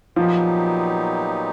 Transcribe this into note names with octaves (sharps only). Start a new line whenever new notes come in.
A#2 F3 F#3 B3 D#4 G4